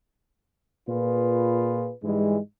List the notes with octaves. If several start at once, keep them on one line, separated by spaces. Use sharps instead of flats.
A#2 F4 G#4 B4
G#2 E3 G3 G#3